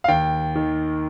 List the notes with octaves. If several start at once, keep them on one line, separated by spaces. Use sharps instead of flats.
F5
D#2 G5
D#3